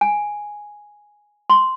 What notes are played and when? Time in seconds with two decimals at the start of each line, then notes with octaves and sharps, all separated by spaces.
0.01 G#5
1.50 C6